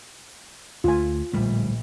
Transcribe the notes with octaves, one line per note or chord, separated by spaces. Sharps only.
D2 A3 F4 G#5
D1 A#1 G3 A3